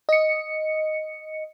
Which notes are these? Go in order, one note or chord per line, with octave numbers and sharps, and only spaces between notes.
D#5 C#7